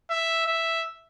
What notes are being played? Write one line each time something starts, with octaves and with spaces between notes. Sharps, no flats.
E5
E5